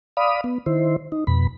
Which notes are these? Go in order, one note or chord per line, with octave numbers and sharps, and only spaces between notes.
D5 F5 B5 D#6
B3
D#3 E4 C5
D#4
F2 B2 B5